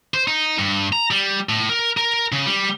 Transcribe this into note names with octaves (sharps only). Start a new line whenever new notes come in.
C5
D#4
G2
A#5
G3
A2
A#4
A#4
C#3
G3